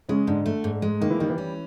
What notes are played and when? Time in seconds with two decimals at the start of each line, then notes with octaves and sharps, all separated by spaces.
0.09 C#3 G#3 C#4
0.27 G#2 D3 D4
0.46 A3
0.64 G#2
0.82 G#3
1.01 D#3 A#3 D#4
1.10 E3 E4
1.19 D#3 G3 D#4
1.29 E3 E4
1.38 C#4